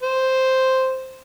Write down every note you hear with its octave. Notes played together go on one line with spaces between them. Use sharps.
C5